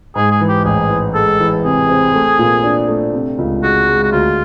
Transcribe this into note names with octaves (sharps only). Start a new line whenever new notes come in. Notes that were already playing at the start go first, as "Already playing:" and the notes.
G#2 G#4
G#4
E3
G4
A1 G#4
E3
G#3 A4
E3
C3 G#4
C4
A3
A#2
D4
A3
C3
C#2
G#3 F#4
G#3
F#4
D2 F4